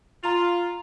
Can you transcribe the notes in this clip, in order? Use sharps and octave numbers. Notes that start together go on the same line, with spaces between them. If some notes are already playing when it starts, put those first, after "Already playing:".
F4 A#5 F7